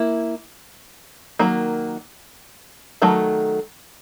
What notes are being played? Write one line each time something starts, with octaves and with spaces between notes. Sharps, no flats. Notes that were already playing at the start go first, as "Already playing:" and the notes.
Already playing: A#3 E4
D#3 F#3 A#3
D#3 F#3 A3